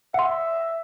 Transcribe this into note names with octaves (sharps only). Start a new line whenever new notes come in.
E5 F#5 C6